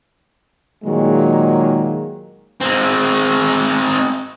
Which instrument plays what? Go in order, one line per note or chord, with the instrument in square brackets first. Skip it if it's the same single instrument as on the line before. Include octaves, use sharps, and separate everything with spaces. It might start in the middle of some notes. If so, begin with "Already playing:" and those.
[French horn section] A#2 D#3 F#3 G#3 A#3
[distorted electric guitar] G#3 C4